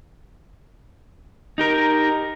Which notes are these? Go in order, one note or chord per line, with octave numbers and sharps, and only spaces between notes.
D#4 G4 A#4